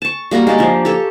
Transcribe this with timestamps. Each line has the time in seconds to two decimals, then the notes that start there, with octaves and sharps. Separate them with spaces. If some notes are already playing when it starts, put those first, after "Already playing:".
0.02 A5 C#6
0.31 G3 A#3 F#4 A#4
0.47 G#3 A#3 G4 D5
0.59 F3 D4
0.85 G4 A4 C#5